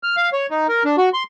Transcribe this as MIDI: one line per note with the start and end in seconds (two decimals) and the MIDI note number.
0.03 0.16 89
0.17 0.30 77
0.33 0.46 73
0.51 0.67 63
0.69 0.83 70
0.85 0.96 62
0.98 1.09 66
1.14 1.23 84